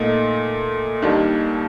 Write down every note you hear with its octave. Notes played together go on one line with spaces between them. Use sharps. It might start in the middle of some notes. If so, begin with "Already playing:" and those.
Already playing: A#2 A3 D#4
D#2 D#3 G3 A#3 D4